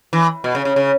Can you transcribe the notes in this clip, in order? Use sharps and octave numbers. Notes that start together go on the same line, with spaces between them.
E3
B2
C#3
C#3
C#3